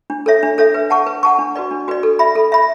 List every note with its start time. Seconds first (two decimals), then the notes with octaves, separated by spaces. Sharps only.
0.10 D4
0.26 A4 C#5 E5
0.43 D4
0.58 A4 C#5 E5
0.74 B4
0.90 F#5 A5 C#6
1.07 B4
1.23 F#5 A5 C#6
1.39 D4
1.56 F#4 B4 D5
1.71 D4
1.88 F#4 B4 D5
2.03 A4
2.19 E5 B5
2.36 A4
2.52 E5 B5